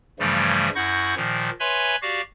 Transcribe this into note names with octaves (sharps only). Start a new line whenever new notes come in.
G2 C#3 E3 F3 G3 A3
F#2 E4 F#5 C#6 G6 A#6
A#2 D#3 F3
B4 C#5 E5 G#5 B5 C6
F#4 G4 D5 F5